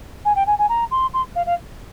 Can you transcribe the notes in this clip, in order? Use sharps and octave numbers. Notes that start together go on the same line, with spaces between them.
G#5
G5
G#5
G#5
A#5
C6
C6
F5
F5